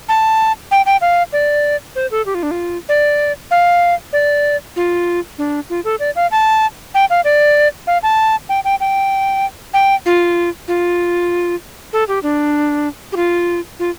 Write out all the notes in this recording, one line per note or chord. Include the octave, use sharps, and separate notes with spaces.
A5
G5
G5
F5
D5
C5
A4
G4
F4
D4
F4
D5
F5
D5
F4
D4
F4
A4
D5
F5
A5
G5
F5
D5
F5
A5
G5
G5
G5
G5
F4
F4
A4
G4
D4
G4
F4
F4